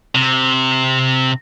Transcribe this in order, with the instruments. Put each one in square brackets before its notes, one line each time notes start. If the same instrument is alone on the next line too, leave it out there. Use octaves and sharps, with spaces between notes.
[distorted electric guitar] C3